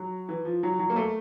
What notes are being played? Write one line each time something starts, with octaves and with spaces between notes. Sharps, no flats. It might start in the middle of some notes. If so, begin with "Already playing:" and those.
Already playing: F#3
E3
F3
F#3
F#3
A#3
A3